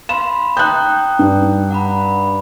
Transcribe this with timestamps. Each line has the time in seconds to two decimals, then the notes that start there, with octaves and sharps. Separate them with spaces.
0.09 F5 B5 C6 E7
0.57 G5 A#5 D#6 F#6 G6
1.19 G2
1.71 F#5 A#5 B5